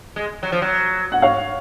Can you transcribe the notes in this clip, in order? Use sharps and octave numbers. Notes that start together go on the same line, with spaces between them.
G#3
F#3
F3
F#3
F#5
C#5 F5